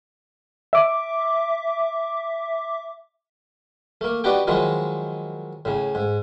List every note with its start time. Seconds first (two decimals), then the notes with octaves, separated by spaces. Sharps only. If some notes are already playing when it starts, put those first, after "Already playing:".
0.73 E5 D6
4.01 A3 A#3
4.24 B3 D4 D#4 F#4 G4 G5
4.47 D#3 F3 F#3 G#3 D#4 E4
5.65 A2 C#3
5.95 G#2